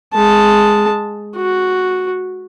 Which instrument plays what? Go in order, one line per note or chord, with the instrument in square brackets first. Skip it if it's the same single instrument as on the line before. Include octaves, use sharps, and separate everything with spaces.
[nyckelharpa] G#3 A5
F#4